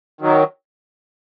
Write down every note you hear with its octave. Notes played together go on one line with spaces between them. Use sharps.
D#3 F#3